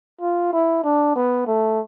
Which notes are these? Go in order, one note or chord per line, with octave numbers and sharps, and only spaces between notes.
F4
E4
D4
B3
A3